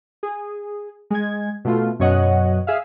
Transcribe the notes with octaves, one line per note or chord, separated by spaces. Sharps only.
G#4
G#3 G#6
B2 A3 F4
F#2 B2 C#5 D#5 F#5
G#4 E5 F5